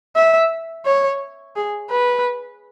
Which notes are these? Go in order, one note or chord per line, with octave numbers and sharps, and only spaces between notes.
E5
C#5
G#4
B4